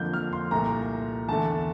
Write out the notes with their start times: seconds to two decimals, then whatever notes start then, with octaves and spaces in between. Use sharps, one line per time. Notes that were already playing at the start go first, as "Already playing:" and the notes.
Already playing: F2 D3 F3 A#3 G6
0.13 F6
0.33 C6
0.51 C2 A#2 A3 A#5
1.28 E2 D3 A3 A5